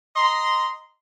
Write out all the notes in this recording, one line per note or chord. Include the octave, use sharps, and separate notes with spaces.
D#5 A#5 C6